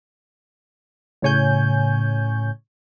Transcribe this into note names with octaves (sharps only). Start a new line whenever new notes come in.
A2 C#3 C#5 G#5 G6